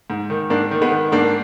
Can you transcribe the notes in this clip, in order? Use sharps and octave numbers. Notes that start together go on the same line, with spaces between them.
G#2
D#3
G#2 A#3 D4
D#3
G#3 B3
D#3
G#2 A#3 D4